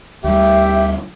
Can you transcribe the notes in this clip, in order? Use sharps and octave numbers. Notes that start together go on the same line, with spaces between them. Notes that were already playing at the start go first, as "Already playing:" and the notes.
D2 G3 G4 E5